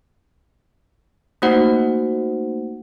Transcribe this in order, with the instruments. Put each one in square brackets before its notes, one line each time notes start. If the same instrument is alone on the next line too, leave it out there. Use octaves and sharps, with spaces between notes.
[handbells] A3 A#3 D#4 F#4 C5 F#5